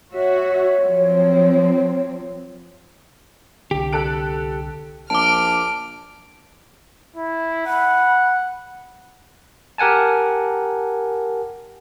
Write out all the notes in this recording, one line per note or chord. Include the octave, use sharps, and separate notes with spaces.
F#4 C#5 E5
F3 F#3 C4
C2 D3 G4
A4 F#6 D7
A#1 A5 D6 F6 D7
E4
F#5 B5
G4 A#4 F#5 G#5 A5